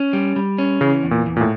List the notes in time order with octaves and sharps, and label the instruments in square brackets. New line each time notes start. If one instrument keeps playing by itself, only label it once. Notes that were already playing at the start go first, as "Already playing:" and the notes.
Already playing: [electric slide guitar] C#4
G3
G3
C#4
[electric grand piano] C#3 [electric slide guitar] E3
[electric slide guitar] E2
[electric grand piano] A#2
[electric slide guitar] E2
[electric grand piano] A#2
A2